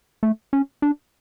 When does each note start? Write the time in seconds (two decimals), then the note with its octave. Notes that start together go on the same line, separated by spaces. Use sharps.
0.23 A3
0.53 C#4
0.82 D4